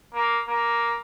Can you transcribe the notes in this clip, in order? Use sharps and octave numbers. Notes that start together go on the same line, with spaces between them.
A#3
A#3